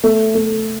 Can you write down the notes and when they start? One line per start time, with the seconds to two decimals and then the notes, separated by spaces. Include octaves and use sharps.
0.04 A3
0.35 A3